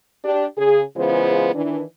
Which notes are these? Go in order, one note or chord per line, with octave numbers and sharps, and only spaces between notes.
D4 G4
C#3 G#4
C#3 E3 G#3 B3 F4 C5
D#3 E3 D4